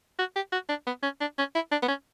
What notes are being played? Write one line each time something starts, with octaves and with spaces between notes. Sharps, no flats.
F#4
G4
F#4
D4
B3
C#4
D4
C#4
E4
D4
B3
C#4